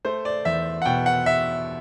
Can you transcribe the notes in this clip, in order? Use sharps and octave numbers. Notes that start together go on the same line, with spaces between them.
A3 C5
D5
E2 E5
F#5
B2 G5
F#5
E5